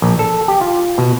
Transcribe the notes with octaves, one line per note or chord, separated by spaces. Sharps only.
A#1
A4
G4
F4
B2